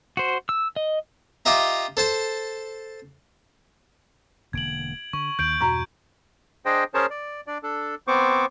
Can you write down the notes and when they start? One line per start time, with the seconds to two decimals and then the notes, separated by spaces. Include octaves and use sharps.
0.17 F#4 C5
0.49 E6
0.76 D#5
1.45 F4 G4 D#5 E5 A#5
1.97 A4 C5 A5
4.53 E1 D3 A#3 G#6 D7 F#7
5.13 D3 C#6
5.39 D#2 D#3 G6 D7 F#7
5.61 E2 G2 B2 F#4 A#5 C#6
6.66 D4 G#4 C5 D#5 G5
6.94 C#4 G#4 A#4 C5 C#5 A5
7.10 D5
7.47 D4 D5
7.63 D4 A4
8.07 B3 C4 C5 C#6 D6